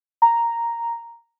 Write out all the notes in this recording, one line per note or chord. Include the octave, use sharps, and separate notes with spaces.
A#5